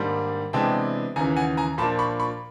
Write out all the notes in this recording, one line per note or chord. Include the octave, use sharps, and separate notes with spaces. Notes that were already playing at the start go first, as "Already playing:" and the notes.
Already playing: G#2 D#3 G3 A#3 D4
C3 E3 G#3 B3 D4 G5 A5
D#2 C#3 E3 G#5 A#5
F#5 G#5
G#5 A#5
A#2 F3 A#3 D4 A5 B5
B5 C#6
B5 C#6